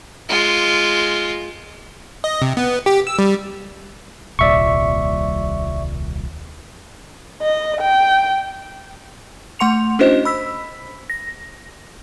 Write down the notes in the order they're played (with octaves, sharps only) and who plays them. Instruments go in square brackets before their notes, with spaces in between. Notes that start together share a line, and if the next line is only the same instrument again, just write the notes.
[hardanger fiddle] G#3 F4
[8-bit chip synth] D#5
C3
B3
G4
E6
G3
[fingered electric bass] D#1 C2 A#2 [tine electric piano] D5 E5 C#6
[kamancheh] D#5
G5
[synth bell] A3 F#5 C6 C#7 F7
C#4 D4 E4 F#4 C5 D#5
B5 E6 B6
A#6